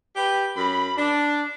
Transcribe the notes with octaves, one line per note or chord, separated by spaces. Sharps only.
G4 B4 G5
F#2 B5
D4